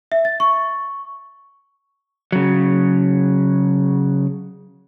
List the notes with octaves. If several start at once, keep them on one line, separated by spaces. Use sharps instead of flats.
E5
A6
C#6
C#3 F#3